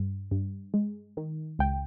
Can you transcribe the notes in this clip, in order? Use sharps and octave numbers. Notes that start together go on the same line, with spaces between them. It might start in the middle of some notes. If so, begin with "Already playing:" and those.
Already playing: G2
G2
G#3
D#3
C#2 G5